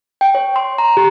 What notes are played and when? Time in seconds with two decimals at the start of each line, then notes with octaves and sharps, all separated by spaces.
0.21 G5
0.35 C#5
0.56 C6
0.78 A#5
0.97 G4